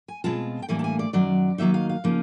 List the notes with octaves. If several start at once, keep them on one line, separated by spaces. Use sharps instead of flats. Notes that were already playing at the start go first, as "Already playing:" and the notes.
G#5
B2 G#3 C4 F4 A5
G5
A2 E3 G3 A#3 D4 G#5
A5
G#5
D5
F#2 D#3 F#3 D5
D#3 F#3 A#3 D#4 E5
F5
F5
C#3 F3 A#3 D#4